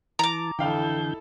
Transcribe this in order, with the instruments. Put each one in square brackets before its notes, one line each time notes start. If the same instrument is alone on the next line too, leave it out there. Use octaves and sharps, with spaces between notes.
[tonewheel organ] E3 A5 [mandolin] A#5 D6
[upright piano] F2 F5 G5 [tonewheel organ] D3 E3 G6 [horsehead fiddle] E4 A4